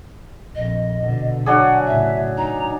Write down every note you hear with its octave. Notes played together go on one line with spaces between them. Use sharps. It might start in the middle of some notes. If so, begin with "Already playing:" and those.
A#1 F2 D#5
B2 D3
F#3 D4 G#4 F#5
A2 C#3 E5
D#4 A#5